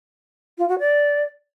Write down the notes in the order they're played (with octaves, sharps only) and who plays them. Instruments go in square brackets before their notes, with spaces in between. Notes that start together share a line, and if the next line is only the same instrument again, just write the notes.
[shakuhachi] F4
F#4
D5